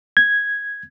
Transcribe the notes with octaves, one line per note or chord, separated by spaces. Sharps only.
G#6